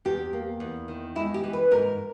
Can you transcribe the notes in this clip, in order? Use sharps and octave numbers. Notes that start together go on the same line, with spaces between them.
E2 G4
A#3
E2
D#3
G#3 E4
G4
E3
B4
G#2 A#4